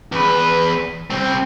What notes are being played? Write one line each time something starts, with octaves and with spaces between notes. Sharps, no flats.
E2 B4
C2 C4